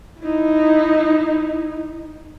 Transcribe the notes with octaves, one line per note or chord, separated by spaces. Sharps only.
D#4 E4